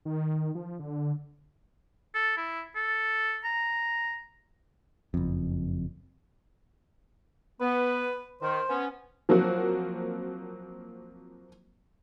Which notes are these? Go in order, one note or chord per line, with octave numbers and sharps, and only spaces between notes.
D#3
F3
D3
A4
E4
A4
A#5
F#1 F2
B3 B4
D#3 C5
B3 C#4
F3 F#3 A#3 C4 F#4